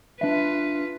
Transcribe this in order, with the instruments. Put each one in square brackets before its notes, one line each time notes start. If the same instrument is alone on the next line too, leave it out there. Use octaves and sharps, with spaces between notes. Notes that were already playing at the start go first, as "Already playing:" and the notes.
[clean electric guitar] D4 E5 [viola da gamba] F4 B4